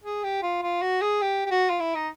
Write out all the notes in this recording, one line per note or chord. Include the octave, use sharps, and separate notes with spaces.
G#4
G4
F4
F4
F#4
G#4
G4
G4
F#4
F4
E4
D#4